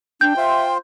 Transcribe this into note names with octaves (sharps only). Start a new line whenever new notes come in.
D4 G5 G6
F4 C5 E5